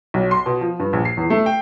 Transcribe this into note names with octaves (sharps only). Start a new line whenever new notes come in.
B1
C6
B2
F3
G2
A#1
C7
E2
A3
G5